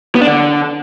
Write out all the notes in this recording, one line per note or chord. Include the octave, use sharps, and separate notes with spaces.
B3
D4
D3